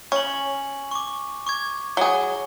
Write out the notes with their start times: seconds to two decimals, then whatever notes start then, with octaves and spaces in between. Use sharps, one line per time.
0.12 C#4 C#6 F#7
0.91 C#6 D6
1.47 C#6 D6 G#6
1.97 F#3 G#4 G7